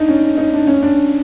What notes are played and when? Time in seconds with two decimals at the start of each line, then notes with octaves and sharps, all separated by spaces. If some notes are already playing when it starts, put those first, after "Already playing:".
Already playing: D4 D#4
0.08 C#4
0.23 D4
0.37 D#4
0.54 D4
0.67 C#4
0.83 D4